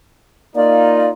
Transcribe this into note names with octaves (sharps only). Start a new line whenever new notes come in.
A#3 D#4 F4 D5